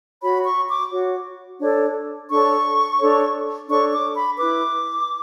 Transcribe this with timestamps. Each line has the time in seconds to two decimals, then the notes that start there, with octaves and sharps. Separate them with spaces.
0.22 F#4 C#5 B5
0.45 C#6
0.68 D6
0.91 F#4 C#5
1.61 D4 A4 C#5
2.30 D4 A4 C#5 C#6
2.99 D4 A4 C#5
3.69 D4 A4 C#5 C#6
3.92 D6
4.15 B5
4.38 E4 B4 D6